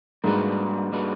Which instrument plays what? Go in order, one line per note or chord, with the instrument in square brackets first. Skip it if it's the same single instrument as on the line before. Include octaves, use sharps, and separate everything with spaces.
[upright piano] G#2 [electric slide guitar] G3 A#3 D4 F#4 B4
[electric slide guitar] G3 A#3 D4 F#4 B4